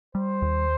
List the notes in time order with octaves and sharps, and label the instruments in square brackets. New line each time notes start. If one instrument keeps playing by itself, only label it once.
[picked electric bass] G3 [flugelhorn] C5
[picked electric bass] D#2